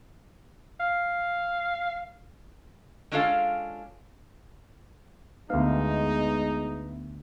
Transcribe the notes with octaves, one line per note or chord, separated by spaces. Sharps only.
F5
G#3 C#4 D4 F4 A4 F5
D2 G#3 B3 D#4 E5 F5